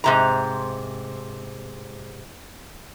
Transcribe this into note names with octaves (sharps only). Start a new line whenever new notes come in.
G#2 C3 A#5